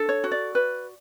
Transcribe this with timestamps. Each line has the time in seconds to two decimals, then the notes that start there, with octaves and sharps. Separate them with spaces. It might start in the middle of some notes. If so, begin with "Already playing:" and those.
Already playing: D4 A4
0.09 C#5
0.24 F#4
0.32 D5
0.55 B4